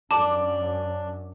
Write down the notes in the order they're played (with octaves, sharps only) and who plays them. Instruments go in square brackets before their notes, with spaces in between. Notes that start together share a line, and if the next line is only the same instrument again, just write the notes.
[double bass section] F#2 [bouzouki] D4 [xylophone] A5 [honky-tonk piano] D6